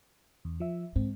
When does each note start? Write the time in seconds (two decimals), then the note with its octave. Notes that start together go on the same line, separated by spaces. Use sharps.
0.45 E2
0.60 F3 E5
0.96 G#2 C4